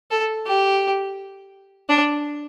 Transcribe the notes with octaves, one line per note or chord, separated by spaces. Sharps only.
A4
G4
D4